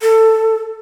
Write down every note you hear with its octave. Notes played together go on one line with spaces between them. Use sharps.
A4